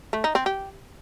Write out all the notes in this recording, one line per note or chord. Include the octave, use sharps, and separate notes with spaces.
A3
D#4
C4
G4